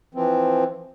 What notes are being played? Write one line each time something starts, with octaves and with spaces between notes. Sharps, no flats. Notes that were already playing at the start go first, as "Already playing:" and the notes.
E3 F3 C4